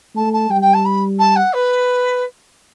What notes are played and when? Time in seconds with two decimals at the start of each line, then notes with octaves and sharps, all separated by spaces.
0.15 A3 A5
0.33 A5
0.50 G3 G5
0.61 G5
0.73 A5
0.85 B5
1.19 A5
1.36 F#5
1.53 B4